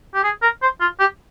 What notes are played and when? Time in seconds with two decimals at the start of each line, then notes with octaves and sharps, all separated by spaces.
0.14 G4
0.24 G#4
0.43 A#4
0.62 C5
0.81 F4
1.00 G4